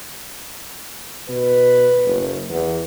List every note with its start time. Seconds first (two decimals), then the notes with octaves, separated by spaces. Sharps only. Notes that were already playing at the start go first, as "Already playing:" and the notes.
1.29 B2 B4
2.04 F#1
2.50 E2 B3